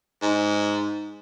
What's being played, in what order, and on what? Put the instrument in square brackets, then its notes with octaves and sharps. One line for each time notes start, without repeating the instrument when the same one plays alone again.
[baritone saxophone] G#2